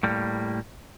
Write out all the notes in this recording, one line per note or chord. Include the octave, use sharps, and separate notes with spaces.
A2 G3 A#3